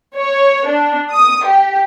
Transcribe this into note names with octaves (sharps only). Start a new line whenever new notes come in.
C#5
D4
D#6
G4